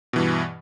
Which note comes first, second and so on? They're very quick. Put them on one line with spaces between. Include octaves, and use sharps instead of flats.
B2 E3 G2